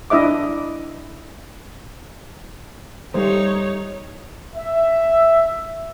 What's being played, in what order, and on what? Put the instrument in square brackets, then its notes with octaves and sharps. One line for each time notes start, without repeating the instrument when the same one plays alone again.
[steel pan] D4 E4 D#5 E5 D6
[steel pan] G3 A3 C5 [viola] D#4 C#5
[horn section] E5